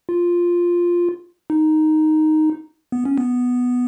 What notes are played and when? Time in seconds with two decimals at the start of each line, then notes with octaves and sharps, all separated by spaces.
0.09 F4
1.50 D#4
2.92 B3
3.05 C#4
3.18 B3